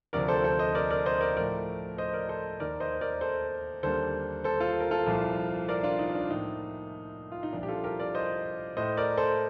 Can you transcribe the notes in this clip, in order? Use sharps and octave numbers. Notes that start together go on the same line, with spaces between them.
D2 C3 F3 A#4 D5
A4 C5
A4 C5
C5 D#5
A#4 D5
A#4 D5
C5 D#5
A#4 D5
A2 F3 A3 A#4 D5
C5 D#5
A#4 D5
A4 C5
D#2 D#3 A#3 A#4 D5
C5 D#5
C5
A#4 D5
A4 C5
D#2 D3 G3 A#3 A4 C5
A4 C5
F4 A4
A#4
F4 A4
C2 A#2 F3
A#4 D5
D4 F4
D#4
D4
A2 F3 A#3 D#4
F4
D#4
C2 A#2 F3 D4
G4
F4 A4
G4 A#4
A#4 D5
C5 D#5
A2 A3 C5 D#5
A#4 D5
A4 C5